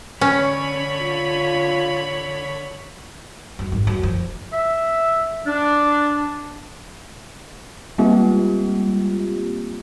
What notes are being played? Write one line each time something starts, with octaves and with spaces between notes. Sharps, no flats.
D3 C#4 C#5 B5
F4
F#2
G#1
F#2
F3
E5
D4
G3 G#3 A#3 C4 F4 G4